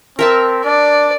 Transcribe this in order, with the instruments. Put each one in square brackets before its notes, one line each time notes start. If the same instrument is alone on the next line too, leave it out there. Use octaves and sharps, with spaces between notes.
[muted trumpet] C4 [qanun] A#4 E5 A5
[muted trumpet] D4 [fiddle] D5